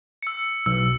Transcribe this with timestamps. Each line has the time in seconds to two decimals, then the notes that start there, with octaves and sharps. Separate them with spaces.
0.23 E6 C#7
0.66 B1 E6